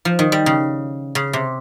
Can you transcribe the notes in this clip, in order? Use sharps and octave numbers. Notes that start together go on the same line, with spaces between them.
F3
D#3
G3
C#3
C#3
C3